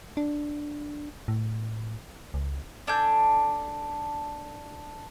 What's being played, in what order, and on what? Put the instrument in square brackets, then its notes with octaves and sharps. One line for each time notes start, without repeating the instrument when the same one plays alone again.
[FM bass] D4
A2
C#2
[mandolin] D4 A4 G#5 G6